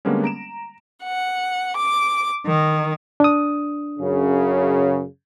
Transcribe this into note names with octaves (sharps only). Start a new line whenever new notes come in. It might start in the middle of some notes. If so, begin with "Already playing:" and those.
D3 G3 G#3 A#3 B3 C#4
A#5 D7 E7
F#5
D6
D#3
D4 D#6
F#2 C#3